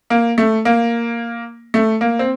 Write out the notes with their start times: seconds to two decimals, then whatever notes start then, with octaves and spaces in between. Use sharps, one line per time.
0.10 A#3
0.38 A3
0.65 A#3
1.74 A3
2.01 A#3
2.19 C4